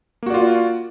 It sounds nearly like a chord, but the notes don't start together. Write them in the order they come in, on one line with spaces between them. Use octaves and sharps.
A#3 F#4 D5 F4